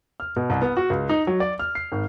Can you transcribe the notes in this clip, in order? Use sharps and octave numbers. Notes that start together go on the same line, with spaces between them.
F6
B2
C2
B3
F#4
C#2
D#4
F#3
D5
F6
C7
G#1